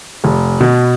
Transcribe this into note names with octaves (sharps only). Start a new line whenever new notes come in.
F1
B2